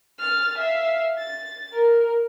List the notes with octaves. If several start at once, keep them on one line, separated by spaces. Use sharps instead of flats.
F6 A6
E5 F5
A6
A#4